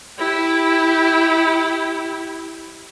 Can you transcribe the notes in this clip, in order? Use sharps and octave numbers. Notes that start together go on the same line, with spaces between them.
E4 G4